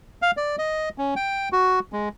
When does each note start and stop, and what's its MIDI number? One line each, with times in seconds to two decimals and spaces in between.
0.22 0.31 77
0.37 0.56 74
0.58 0.89 75
0.98 1.14 61
1.16 1.49 79
1.53 1.80 66
1.93 2.09 56